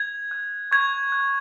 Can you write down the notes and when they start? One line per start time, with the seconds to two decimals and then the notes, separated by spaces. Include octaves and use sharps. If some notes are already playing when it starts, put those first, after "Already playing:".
Already playing: G#6
0.31 F#6
0.71 C#6 G#6
1.12 F#6